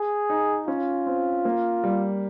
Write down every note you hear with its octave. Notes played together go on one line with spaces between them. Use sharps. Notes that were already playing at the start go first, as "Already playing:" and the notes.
Already playing: G#4
D#4
C#4 F4
C4
A#3
G3